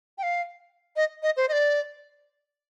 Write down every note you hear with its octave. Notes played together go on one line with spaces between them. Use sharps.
G5
F5
D#5
D#5
C5
D#5
D5